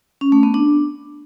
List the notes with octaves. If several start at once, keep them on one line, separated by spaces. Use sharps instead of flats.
C#4
A3
B3
D4